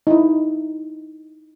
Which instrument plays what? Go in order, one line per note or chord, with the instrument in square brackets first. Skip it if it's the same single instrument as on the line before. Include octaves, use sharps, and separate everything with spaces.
[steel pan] D#4 E4